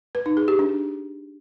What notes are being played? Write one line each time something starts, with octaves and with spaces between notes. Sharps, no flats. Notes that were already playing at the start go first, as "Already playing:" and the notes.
B4
D#4
G#4
G4
D4